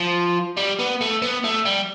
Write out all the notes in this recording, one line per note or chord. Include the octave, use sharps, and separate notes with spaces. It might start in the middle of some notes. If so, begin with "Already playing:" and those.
Already playing: F3
G3
B3
A3
B3
A3
G3